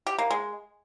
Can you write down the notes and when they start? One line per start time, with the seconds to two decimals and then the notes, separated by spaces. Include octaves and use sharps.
0.07 G4
0.18 A#3
0.30 G#3